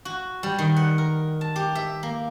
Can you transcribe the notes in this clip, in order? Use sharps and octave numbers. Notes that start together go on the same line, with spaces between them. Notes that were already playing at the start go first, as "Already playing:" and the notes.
F#4
G3
D#3
F#5
A#4
A5
G4
E5
A#3